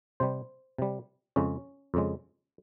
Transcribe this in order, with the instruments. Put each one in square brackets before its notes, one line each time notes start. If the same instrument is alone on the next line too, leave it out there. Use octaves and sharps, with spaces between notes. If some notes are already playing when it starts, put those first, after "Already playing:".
[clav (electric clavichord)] C3 G3 C5
C3 G3
F2 C#3 G#3 C#4
F2 C#3 G#3